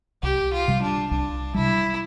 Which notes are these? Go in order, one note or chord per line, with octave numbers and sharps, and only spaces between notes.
C2 G4
F4
C3 G3
D4
C2 D4
C3 G3 E4